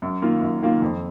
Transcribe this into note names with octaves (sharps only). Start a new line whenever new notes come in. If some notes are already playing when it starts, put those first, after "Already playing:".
F#2
D#3 A#3 F4
F#2
D#3 A#3 F4
F2